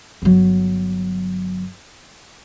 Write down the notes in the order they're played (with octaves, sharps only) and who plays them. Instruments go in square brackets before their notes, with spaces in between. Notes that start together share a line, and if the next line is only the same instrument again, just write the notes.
[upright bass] G1 F#3